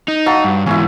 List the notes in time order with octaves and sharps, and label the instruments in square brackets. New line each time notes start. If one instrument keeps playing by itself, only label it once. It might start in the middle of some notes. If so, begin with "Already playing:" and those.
[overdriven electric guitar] D#4
[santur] F#3 F5 A5
[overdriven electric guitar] G2
[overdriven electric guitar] E2 G#2 [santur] C#4 E4